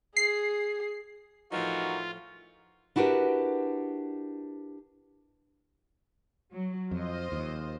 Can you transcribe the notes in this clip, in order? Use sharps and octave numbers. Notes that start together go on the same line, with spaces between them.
G#4 C7
A2 E3 F3 D#4 F4 F#4 A#4
D4 E4 F#4 G4 A#4 B4
F#3
F2 F4 C5 D#5
D#2